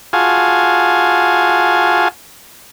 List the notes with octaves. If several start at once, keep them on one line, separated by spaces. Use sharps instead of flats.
F4 F#4 G#4 F5 G#5 A5